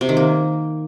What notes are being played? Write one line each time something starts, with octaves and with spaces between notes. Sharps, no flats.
C3
D#3
A#3